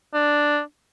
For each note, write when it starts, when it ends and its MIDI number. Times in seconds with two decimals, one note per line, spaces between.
0.14 0.61 62